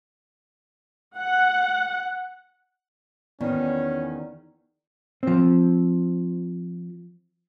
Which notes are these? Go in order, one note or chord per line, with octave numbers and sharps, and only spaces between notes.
F#5
E2 D#3 B3 C#4 D5
F3 C4